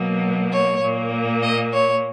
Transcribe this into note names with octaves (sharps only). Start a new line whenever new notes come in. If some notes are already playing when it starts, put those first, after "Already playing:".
Already playing: B2 F#3 A#3
C#5
A#2 A#3
D#5
C#5